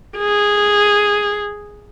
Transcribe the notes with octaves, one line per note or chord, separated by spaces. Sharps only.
G#4